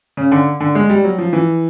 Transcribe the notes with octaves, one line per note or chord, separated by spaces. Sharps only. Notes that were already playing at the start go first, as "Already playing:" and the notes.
C#3
D3
D3
G#3
G3
F#3
F3
E3